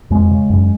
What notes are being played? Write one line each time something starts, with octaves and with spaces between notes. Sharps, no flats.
F2 G#3
C#3
F#2